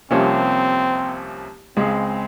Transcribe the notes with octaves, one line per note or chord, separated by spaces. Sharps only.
C2 C3 F3 A#3 C4 C#4
C#2 C#3 G#3 C4